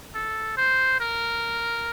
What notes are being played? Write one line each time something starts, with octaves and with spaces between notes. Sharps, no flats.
A4
C5
A#4